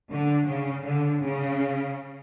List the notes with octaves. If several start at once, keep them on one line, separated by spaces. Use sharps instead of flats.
D3
C#3
D3
C#3